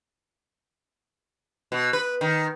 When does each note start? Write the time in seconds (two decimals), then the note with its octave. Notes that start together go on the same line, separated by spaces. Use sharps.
1.72 B2
1.93 B4
2.21 D#3